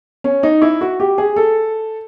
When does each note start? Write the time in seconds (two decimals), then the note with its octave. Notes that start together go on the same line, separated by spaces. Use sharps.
0.24 C#4
0.43 D#4
0.62 E4
0.81 F#4
1.00 G4
1.18 G#4
1.36 A4